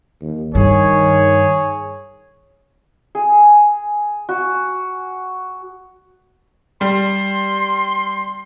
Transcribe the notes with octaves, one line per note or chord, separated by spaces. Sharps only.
D#2
G2 D#3 G#4 C#5
G#4
F#4
G3 C6